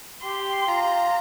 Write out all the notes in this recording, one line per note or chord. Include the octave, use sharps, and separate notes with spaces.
G4 C6
F4 A#5